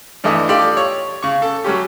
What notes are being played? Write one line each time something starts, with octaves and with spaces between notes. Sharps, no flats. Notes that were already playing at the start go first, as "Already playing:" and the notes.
G2 E3 A3 D#5
F4 G4 A4 D5
C#5
C#3 C#6
A4
F#3 G3 C#4 G4